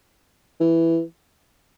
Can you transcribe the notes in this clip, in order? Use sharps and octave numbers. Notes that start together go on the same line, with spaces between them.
E3